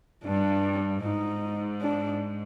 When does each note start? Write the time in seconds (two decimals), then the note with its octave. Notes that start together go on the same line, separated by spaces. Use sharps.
0.25 G2 D4
1.03 G#2 D#4
1.82 D4